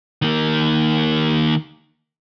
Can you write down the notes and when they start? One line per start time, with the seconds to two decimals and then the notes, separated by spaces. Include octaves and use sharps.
0.22 D#3 A#3